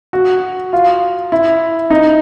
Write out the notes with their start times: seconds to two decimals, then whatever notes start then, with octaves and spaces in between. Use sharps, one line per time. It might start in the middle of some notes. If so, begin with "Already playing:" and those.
0.13 F#4
0.73 F4
1.32 E4
1.90 D#4